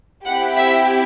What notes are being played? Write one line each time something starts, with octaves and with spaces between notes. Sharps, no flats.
C4 E4 G4 F#5
E5